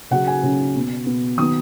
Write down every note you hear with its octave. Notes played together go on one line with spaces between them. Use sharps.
C#3 F#3 C#4 F#5
G#5
C#3 F#3 C#4
B2 B3
B2 B3
D#3 F#3 B3 D#6